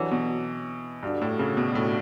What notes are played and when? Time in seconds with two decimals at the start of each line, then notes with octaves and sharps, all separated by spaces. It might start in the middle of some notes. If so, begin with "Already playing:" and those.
Already playing: G2 D3 E3 F#3
0.11 B2
1.02 G2 D3 G3 D4 F#4
1.22 A2
1.39 C#3
1.57 B2
1.75 A2